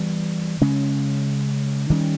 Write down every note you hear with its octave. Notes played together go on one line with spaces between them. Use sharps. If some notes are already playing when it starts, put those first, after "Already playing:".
Already playing: E3 G3 B3
C#3 G#3 C#4
D#3 G3 C#4